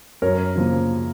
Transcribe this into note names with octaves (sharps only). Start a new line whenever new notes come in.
F#2 A#4 C#5
C#3 F3 A#3